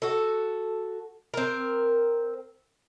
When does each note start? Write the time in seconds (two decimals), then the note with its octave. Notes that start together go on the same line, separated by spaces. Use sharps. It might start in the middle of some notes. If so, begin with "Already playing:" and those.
0.02 F#4 A4
1.34 C4 A#4